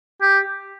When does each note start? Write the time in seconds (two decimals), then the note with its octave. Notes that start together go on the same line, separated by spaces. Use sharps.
0.22 G4